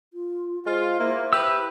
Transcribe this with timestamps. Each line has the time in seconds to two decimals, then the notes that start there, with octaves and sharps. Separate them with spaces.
0.13 F4
0.66 G#3 F4 C5
1.00 A#3 E4
1.33 G4 B4 E6